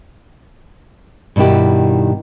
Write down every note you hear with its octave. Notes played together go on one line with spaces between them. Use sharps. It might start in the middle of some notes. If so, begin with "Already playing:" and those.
G2 B2 D#3 E4 G4